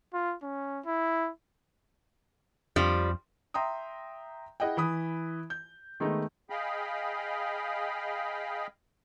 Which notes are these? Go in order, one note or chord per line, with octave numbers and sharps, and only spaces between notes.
F4
C#4
E4
F2 F3 G3
E5 G5 A#5 C6 D#6
E4 G#4 D#5 F#5 G5
E3 B5 D#6
G6
D#3 G#3 A3 B3 D#4
G#4 D#5 F5 G5 B5